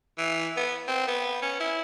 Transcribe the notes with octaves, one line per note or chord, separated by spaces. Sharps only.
E3
B3
C4
B3
C#4
E4